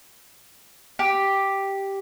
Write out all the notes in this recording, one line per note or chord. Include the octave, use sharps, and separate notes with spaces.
G4